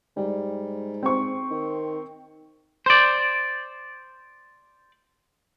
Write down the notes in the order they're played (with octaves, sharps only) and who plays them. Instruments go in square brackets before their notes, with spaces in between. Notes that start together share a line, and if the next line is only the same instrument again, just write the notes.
[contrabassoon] G#2 [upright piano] G3
[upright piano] C4 C#6
[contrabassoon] D#3
[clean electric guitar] C5 D5